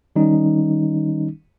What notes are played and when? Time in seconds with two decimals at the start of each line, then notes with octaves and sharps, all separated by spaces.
0.16 D#3 G3 C#4 D#4